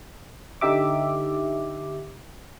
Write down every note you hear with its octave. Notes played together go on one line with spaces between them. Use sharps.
D3 D#4 G4 E5 D6